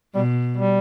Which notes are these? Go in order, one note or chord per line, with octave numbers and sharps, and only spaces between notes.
B2 G3
G3